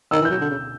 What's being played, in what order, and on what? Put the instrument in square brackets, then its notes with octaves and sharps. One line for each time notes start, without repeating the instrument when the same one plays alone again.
[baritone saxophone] D#3 [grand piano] E6
[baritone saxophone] E3
[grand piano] G6
[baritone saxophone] F#3
D3
C#3